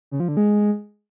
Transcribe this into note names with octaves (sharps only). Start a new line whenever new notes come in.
C#3
F3
D3
G#3